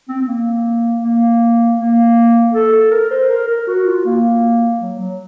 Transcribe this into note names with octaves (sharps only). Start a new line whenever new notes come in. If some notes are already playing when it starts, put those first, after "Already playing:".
C4
C4
A#3
A#3
A#3
A4
A4
A#4
C5
A#4
A#4
F#4
F4
A#3
F#3
F#3